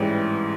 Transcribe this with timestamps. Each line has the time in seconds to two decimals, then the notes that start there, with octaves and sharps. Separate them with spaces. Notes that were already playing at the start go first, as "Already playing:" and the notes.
Already playing: A1 G#2 E3 G3